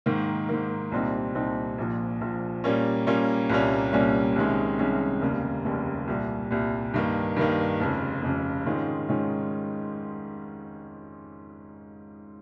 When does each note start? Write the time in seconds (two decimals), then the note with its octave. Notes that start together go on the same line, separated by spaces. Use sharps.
0.06 G#2 D#3 A#3
0.49 G#2 D#3 A#3
0.92 C2 A#2 G3 C4 D#4
1.35 C2 A#2 G3 C4 D#4
1.78 A#1 A#2 F3
2.21 A#1 A#2 F3
2.64 A#2 G3 A#3 C#4
3.07 A#2 G3 A#3 C#4
3.50 C2 A#2 G3 A#3 C#4
3.93 C2 A#2 G3 A#3 C#4
4.36 C2 C3 D#3 G#3 C#4
4.79 C2 C3 D#3 G#3 C#4
5.22 F1 D#2 C#3 G3 A#3
5.65 F1 D#2 C#3 G3 A#3
6.08 C2 A#2 G3
6.51 C2 A#2 G3
6.94 G2 D#3 A#3
7.36 G2 D#3 A#3
7.80 F1 F2 C#3
8.22 F1 F2 C#3
8.66 G#2 D#3 G#3 C#4 F4
9.09 G#2 D#3 G#3 C#4 F4